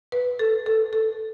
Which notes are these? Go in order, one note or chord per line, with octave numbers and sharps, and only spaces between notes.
B4
A4
A4
A4